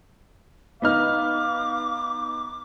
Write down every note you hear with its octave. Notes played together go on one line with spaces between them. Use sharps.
B3 D#4 F5 D6 F6